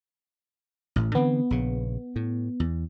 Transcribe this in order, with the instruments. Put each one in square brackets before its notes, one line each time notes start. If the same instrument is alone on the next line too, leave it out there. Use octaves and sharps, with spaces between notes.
[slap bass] A1 A2
[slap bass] D3 E3 C4 [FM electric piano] B3
[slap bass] A#1 C#3
A2
E2